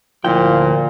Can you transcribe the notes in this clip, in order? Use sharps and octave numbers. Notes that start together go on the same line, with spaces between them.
D2 A#2 F3 E4 G5